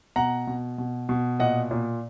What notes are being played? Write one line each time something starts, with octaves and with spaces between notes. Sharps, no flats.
B2 F#5 A#5
B2
B2
B2
A#2 D#5 F#5
A#2